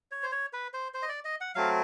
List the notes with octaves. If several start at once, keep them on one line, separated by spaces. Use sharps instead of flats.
C#5
C5
C#5
B4
C5
C5
D#5
D5
D#5
F#5
F#3 A3 C4 F5